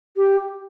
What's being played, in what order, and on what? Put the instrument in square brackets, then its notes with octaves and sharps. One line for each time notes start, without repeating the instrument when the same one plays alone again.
[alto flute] G4